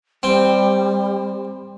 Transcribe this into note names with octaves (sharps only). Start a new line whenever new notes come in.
G3 C4